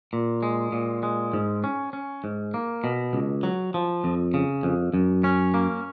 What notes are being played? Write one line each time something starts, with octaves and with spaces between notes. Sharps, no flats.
A#2
G#3
A#2
G#3
G#2
C#4
C#4
G#2
A#3
B2
C#2
F#3
F3
F2
C#3
F2
F#2
C#4
A#3